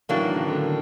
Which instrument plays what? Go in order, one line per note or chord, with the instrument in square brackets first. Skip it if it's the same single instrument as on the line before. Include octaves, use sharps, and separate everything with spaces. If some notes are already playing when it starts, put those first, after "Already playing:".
[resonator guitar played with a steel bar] A2 F#3 A#3 D4 [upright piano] E3
[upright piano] D#3
C#3
D3
D#3